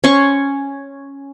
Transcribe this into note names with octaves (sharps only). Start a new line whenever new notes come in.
C#4 C6 C#6